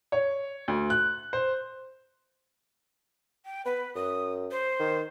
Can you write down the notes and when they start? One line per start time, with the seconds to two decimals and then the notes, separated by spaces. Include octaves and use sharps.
0.12 C#5
0.68 D2
0.90 F#6
1.33 C5
3.45 G5
3.65 B3 B4
3.95 F#2 D#6
4.51 C5
4.80 D#3